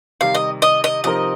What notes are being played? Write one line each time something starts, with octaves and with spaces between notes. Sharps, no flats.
C3 D#3 G3 F5
D#5
D#5
D#5
C3 F3 C4 D#4 A#4 D#5